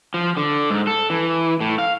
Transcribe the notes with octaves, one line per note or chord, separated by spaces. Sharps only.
F3
D3
G#2
A4
E3
A2
F5